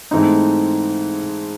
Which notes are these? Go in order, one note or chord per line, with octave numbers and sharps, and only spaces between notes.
G#2 E3 A3 C4 D#4